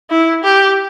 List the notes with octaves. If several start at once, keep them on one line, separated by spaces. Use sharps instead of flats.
E4
G4